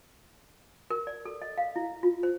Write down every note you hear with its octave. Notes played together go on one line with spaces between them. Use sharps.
A#4
D5
A4
D#5
F5
E4
F4
C5